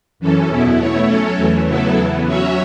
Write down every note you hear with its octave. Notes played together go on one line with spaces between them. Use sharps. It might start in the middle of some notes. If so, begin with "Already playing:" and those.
F#2 E3 C#4 A4
E2 B2 B3 E4
A3 E4 C#5
F#3 C#4 A4 C#5
E2 E3 A3
C#3 F#3 B3 E4 A4
E2 E3 B3
F#3 C#4 F#4 C#5 E5